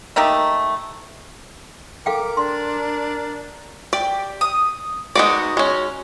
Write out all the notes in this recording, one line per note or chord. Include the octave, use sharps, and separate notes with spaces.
A3 A#3 D#4 G4
A4 A#4 F5 G5 D6
D4 C6
G4 D5
D#6
G#3 B3 D#4 F#4 D5
G#3 C#4